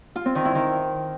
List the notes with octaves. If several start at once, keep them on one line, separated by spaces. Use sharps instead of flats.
F4
C4
D#3
E4
D#3